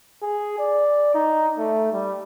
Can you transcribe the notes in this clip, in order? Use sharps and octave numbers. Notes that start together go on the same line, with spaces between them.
G#4
D5
D#4
A3
G3